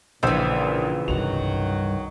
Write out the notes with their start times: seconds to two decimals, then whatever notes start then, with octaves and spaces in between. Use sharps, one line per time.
0.23 A#1 A#2 C#3 E3 C5 E6
1.08 C2 G2 D#3 F#3 F7